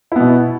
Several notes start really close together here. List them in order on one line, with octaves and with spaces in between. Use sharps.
E4 B3 B2